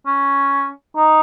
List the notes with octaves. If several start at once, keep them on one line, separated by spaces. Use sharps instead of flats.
C#4
D#4